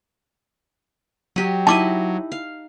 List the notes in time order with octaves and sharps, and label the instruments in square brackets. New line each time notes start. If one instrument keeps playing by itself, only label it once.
[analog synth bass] F#3 [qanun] G4 D#5
[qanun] D#4 E4 D#5 [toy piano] A5 D6
[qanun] F5